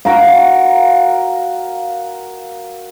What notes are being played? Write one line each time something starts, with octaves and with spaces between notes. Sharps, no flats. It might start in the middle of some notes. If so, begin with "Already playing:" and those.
F#4 A#4 F5